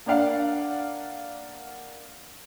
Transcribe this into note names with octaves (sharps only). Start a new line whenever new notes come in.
A#3 D4 D5 F5 F#5